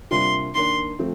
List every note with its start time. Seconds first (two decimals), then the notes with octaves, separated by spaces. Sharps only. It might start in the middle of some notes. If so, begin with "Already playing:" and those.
0.11 C3 G3 A#3 D4 F4 C6
0.55 D#3 A#3 D4 C6
0.99 F3 A3 C4